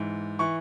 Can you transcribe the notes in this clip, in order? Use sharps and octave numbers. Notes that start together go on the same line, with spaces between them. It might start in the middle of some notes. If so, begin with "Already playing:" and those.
Already playing: G#2 E3
E3 C#6